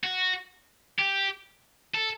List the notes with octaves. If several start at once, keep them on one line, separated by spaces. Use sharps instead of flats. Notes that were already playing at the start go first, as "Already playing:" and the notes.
F#4
G4
A4